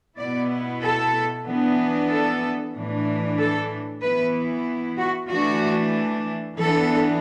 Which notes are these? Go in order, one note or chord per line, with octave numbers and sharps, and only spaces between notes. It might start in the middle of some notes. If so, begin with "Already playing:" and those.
B2 B3 E4 D5
A4
E3 B3 D4
A4
A2 E3 D4
A4
E3 B3 E4 B4
F#4
E3 A3 D4 F#4
E3 B3 D4 A4